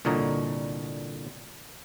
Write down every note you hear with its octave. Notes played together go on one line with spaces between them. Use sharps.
C2 A#2 D3 C#5 D#5 A#5